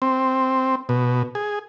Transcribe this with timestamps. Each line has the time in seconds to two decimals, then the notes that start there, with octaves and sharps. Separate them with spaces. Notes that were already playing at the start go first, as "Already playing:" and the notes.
0.02 C4
0.89 B2
1.35 G#4